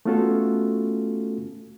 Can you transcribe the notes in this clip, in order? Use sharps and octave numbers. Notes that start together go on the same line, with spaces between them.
A3 B3 C#4 F4 F#4 A4